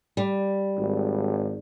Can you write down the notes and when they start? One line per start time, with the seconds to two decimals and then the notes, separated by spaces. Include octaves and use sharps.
0.17 G3
0.78 G#1